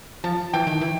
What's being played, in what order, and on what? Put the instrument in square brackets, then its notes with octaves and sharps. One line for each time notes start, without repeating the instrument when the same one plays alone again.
[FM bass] F3 [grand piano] A5
[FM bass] E3 [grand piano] G5
[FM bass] D#3
E3